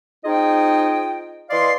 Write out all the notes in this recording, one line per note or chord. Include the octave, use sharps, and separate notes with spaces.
C4 D#4 F4 G#4 D#5 G5
E3 D5 D#5 F5 C6